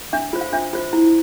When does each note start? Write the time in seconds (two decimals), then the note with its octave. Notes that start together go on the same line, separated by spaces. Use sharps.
0.13 D4 E5
0.33 F4 C5
0.41 F5
0.53 D4 E5
0.73 F4 C5
0.93 E4